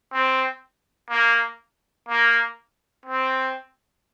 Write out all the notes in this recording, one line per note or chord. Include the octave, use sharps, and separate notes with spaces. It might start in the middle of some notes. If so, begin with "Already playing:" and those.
C4
A#3
A#3
C4